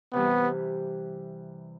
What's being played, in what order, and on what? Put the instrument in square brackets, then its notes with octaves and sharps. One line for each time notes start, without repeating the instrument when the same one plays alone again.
[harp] C3 E3 G3 [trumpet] B3